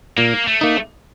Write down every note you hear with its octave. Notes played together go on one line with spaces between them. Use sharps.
A#2 A#3
A3
A#3 D#4